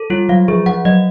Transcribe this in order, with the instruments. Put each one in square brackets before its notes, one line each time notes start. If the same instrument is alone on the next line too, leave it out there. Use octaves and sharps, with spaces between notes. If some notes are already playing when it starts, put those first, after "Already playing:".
Already playing: [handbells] A4
[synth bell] G3 [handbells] F4
[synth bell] F#3 [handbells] F5
[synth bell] F3 [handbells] G#4
[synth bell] F3 [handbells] F#5
[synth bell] F#3 [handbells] D#5